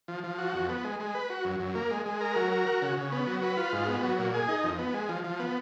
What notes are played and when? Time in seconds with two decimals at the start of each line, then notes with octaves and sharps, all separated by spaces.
0.08 F3
0.24 F3
0.38 F#4
0.54 F2
0.69 B3
0.84 G#3
1.00 G#3
1.14 B4
1.30 F#4
1.45 F#2
1.60 F#2
1.75 A#3
1.91 G#3
2.06 G#3
2.21 A#4
2.36 F#3
2.51 A#4
2.66 F#4
2.82 C#3
2.97 C#3
3.12 B3
3.27 F#3
3.42 B4
3.57 F4
3.72 G#2
3.88 B3
4.03 F#3
4.19 A#2
4.34 G#4
4.48 D#4
4.64 F2
4.79 B3
4.94 G#3
5.09 F3
5.24 F3
5.39 B3